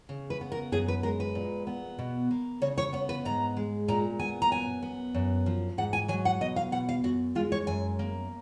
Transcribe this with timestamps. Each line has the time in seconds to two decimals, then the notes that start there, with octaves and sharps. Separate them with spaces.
0.09 C#3
0.30 B4
0.41 B3
0.52 A#4
0.72 F#2 G#4
0.88 B4
1.03 G#3 A#4
1.20 B4
1.35 A#2
1.67 B3
1.99 B2
2.31 A#3
2.62 C#3 C#5
2.78 C#5
2.93 B3 C#5
3.09 B4
3.25 G#2 A#5
3.57 G#3
3.88 A#2 A#5
4.19 B3 G#5
4.42 A#5
4.51 F#2 G#5
4.82 B3
5.14 F#2
5.46 F3
5.78 G#2 F#5
5.93 G#5
6.08 F#3 G#5
6.25 F#5
6.41 B2 D#5
6.56 F5
6.72 B2 F#5
6.89 F5
7.04 F#2 F#4
7.35 G#3 F4
7.52 C#5
7.67 F#2 G#5
7.99 A#3